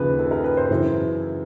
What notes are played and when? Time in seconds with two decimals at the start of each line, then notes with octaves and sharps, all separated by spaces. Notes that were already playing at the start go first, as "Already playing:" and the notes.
Already playing: D#2 C#3 F3 B4
0.19 A4
0.31 A#4
0.44 B4
0.57 C5
0.71 F#2 C#3 E3